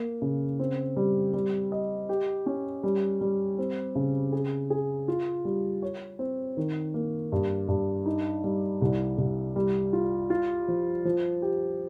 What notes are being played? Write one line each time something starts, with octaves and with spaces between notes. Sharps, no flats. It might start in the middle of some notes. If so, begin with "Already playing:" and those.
Already playing: A#3
C#3
C4
G3
G3
D#5
G4
C#4
G3
G3
C4
C#3
G#4
G#4
F4
G3
C#5
C4
D#3
A#3
G2
G2
D#4
G3
C2
C2
G3
F4
F4
F3
F3
G4